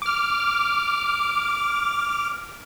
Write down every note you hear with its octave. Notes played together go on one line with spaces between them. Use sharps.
D6 F6